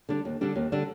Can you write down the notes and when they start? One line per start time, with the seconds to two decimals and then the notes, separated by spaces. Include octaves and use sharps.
0.09 D3 G3 D4
0.25 D#2
0.41 D3 G3 D4
0.56 D#2
0.72 D3 G3 D4